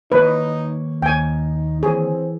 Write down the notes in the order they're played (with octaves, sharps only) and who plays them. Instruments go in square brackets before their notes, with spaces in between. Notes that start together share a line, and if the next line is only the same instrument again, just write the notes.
[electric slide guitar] D#3 A#3 C#5 [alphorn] D#4 [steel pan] B4
[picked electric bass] D#2 [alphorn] D#4 [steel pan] G5 G#5
[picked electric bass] E3 [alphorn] C4 [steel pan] G#4